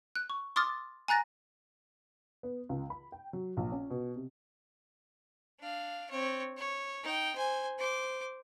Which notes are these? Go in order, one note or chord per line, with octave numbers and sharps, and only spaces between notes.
F#6
C#6
C6 D6 D#6 F6 A6
G#5 A#5 F#6 A6 A#6
B3
C#2
B5
G5
F#3
A#1
C#4
B2
C3
D4 F5
C4 C#5
C#5
D#4 G5
C5 G#5
C5 D6